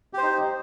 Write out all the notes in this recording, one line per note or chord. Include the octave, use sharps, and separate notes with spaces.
D#4 G4 C5